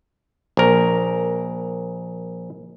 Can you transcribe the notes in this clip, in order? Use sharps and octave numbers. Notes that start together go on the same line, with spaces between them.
A#1 A#4